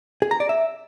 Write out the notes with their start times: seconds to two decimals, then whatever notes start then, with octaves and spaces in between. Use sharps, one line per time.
0.22 G#4
0.31 A#5
0.40 D5
0.49 E5